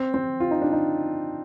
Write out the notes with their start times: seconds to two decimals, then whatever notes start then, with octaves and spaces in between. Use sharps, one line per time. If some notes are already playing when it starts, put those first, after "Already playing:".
Already playing: C4
0.14 C4
0.40 F4
0.51 D#4
0.62 D4
0.72 D#4